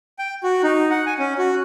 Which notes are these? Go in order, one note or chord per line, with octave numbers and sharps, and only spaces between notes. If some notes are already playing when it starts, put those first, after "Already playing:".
G5
F#4
D#4
F#5
G#5
C#4
F#4